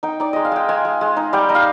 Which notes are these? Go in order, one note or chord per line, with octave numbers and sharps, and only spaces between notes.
D#4 G5
D#4 D5
G#3 D#5
F5
G#3 G5
G#3 G#5
G#3
G#3
D#4
G3 G5
D#4
F5